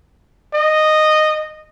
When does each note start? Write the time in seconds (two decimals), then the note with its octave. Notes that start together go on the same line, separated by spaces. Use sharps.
0.54 D#5